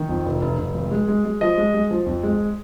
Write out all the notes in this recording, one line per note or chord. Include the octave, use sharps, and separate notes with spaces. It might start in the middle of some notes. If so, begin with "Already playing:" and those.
Already playing: D#3
F2
F1
F1
F1
G#1
G#3
G#3
G#3
F3 D#5
G#3
G#3
F3
F2
G#3